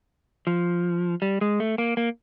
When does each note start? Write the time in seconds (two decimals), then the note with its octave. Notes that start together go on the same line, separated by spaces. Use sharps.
0.47 F3
1.22 G3
1.41 G#3
1.60 A3
1.78 A#3
1.97 A#3